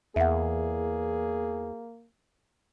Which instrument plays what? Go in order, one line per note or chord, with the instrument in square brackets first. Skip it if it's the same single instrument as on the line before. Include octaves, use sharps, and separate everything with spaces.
[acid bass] E2 [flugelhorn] A#3 [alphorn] G#4 [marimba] E5 F#5